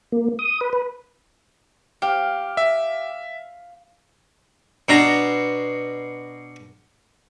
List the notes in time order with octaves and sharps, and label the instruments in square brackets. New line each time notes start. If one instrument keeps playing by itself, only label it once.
[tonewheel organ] A#3
D#6
B4
B4
[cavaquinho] G4 [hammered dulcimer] F5
[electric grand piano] E5
[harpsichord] B2 D4 A#5